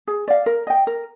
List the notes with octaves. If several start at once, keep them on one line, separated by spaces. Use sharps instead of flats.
G#4
D5 F5
A#4
D#5 G5
A#4